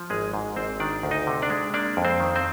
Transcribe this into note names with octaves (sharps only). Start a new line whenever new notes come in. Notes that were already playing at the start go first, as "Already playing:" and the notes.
Already playing: F3
G#1 G#3 G#4
G#2
G#1 C4 C5
D#3 D4 D5
D2
D#4 D#5
C3
D4 D5
G#3
A#3 D4 D5
F2
C4 C5
D#3
C4 C5